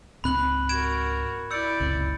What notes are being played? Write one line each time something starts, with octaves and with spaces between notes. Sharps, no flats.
C#2 G#2 C4 B5 F#6 F#7
F#4 A#4 G#6 D7 E7
E4 D5 E6 G6 C#7
F#1 C#2 C3